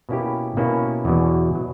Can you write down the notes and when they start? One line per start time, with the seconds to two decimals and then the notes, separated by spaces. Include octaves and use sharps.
0.09 B2 A#3 C#4 E4 G4
0.57 B2 A#3 C#4 E4 G4
1.05 E2 B2 F#3
1.55 B2 F#3